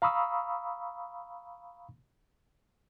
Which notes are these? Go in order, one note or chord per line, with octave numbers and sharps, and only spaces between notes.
F5 A#5 B5 C#6 D#6 E6